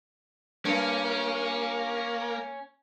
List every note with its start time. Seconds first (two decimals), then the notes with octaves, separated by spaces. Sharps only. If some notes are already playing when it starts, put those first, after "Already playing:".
0.65 G2 A#3 C#4